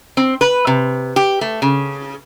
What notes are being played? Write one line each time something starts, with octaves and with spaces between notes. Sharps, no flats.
C4
B4
C3
G4
A3
C#3